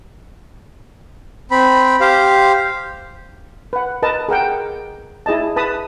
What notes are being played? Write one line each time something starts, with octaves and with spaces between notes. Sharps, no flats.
C4 B5
G4 C5 F5
B4 F#5
A#4 B4 D#5 A5
G#4 A#4 F#5 G5
E4 G#4 D#5 A5
B4 A5 B5 D#6